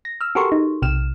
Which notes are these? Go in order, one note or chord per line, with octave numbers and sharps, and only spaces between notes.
A#6
E6 F6
F#4 G4 A4 A#4 C6 C#6
D#4
B1 C3 F6 E7